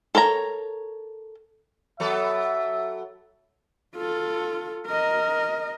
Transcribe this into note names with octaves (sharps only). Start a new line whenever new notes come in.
A4 A#4 C#5 A#5
F#3 B3 A4 E5
F4 A4
A#4 D#5